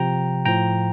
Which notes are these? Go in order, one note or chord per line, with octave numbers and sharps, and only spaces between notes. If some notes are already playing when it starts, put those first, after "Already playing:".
Already playing: C3 F3 G5 A#5
A2 F3 G5 A#5